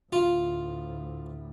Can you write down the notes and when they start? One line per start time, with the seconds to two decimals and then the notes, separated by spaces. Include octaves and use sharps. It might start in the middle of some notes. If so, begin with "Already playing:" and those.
0.13 D2 A2 F4